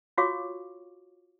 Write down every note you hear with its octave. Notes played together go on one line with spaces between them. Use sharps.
F4 F#4 C#5 F5 C#6 D6